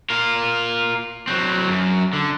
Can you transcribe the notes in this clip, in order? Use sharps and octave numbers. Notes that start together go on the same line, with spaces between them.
F4 A#4
F#3 C4
F#2
D3